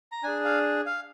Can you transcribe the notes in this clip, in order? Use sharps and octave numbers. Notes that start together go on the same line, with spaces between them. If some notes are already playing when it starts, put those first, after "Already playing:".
A#5
D4 G#4 G#5
F5
F5